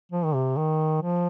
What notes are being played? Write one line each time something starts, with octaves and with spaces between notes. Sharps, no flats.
F3
D#3
C3
D#3
F3